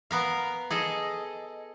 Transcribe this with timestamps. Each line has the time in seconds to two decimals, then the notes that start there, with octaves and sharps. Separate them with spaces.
0.11 B3 A#4 F5
0.70 G#4 A4 D#5